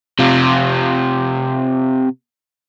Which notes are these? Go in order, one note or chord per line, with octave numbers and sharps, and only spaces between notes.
C3 F4